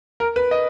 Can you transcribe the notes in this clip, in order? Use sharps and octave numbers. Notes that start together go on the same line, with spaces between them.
A#4
B4
D#5